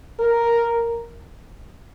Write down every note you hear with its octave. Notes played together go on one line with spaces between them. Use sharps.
A#4